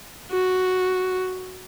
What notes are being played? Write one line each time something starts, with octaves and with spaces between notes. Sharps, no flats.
F#4